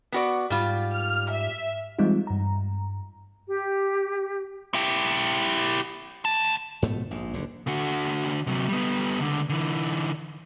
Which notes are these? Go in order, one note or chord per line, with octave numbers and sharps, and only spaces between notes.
B3 F#4 D5
G#2 G3 F4
F6
E5
E3 G3 G#3 C4 D#4 F4
G2 A#5
G4
E4 G4
D2 A5
G#2 B2 F3 A3
A#1 G#2
F#1 D2 D3
D3 F#4
C3 F#3
G3 B3
C#2 D3
D3 E3